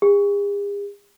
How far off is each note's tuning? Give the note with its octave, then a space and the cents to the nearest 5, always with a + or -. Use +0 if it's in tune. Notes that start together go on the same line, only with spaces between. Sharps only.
G#4 -45